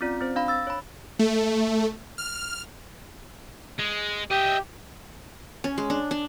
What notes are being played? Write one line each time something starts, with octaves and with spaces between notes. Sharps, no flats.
C4 C#4 F4 D5
C4 C5
D4 F5 B5
E6 A6
C#5 B5
A3
F6
G#3
G4 D#5 E5
C#4
G#3
D4
D4